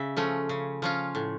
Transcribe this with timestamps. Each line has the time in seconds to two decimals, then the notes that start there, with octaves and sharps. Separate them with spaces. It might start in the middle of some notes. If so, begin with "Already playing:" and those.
Already playing: C#3 E5
0.17 F3 A3 C#4
0.49 C#3
0.82 F3 C#4 F4
1.15 A2